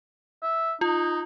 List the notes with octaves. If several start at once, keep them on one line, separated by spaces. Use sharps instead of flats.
E5
D#4 F4